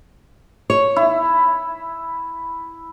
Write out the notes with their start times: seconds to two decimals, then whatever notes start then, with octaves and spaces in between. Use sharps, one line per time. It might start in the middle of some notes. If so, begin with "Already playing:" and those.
0.70 C#5
0.96 E4